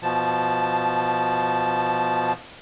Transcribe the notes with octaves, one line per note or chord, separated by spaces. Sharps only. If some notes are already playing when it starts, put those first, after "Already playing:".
B2 F3 A5